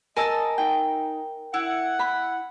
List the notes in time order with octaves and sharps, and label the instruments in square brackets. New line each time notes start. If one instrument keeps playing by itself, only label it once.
[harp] A#4 [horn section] D#5 [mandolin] G#5 A5 E6
[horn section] D#4 [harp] G5
[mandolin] E4 [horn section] F#5
[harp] B5